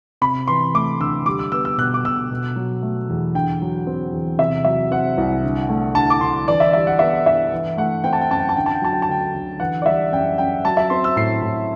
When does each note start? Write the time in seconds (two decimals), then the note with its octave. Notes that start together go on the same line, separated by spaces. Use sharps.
0.21 C3 B5
0.48 E3 C6
0.74 A3 D6
1.00 D2 E6
1.26 G3 D6
1.39 E6
1.52 B3 E6
1.65 E6
1.78 B2 F#6
1.94 D6
2.04 B2 E6
2.31 B2
2.56 F#3
2.82 A3
3.09 E2
3.35 D3 G5
3.61 F#3
3.87 C4
4.12 E2
4.38 C3 E5
4.65 F#3 E5
4.91 C4 F#5
5.18 C2
5.44 D3
5.69 A3
5.95 D2 A5
6.10 D6
6.21 D2 C6
6.48 E3 D5
6.60 E5
6.73 G3 E5
6.87 F#5
6.99 B3 E5
7.26 G2 E5
7.52 E3
7.77 A3 F#5
8.04 C4 G5
8.13 A5
8.21 G5
8.30 F#2 A5
8.39 G5
8.49 A5
8.57 D3 G5
8.66 A5
8.74 G5
8.82 F#3 A5
8.93 G5
9.02 A5
9.09 D2 G5
9.34 D2
9.60 E3 F#5
9.82 D5
9.86 G3 E5
10.12 F#2 G5
10.38 F#2 G5
10.65 F#3 A5
10.77 E5
10.90 C4 C6
11.04 E6
11.16 A2 C7
11.42 A2